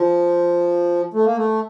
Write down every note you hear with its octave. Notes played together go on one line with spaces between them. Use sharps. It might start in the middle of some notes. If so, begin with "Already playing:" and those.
Already playing: F3
A3
A#3
A3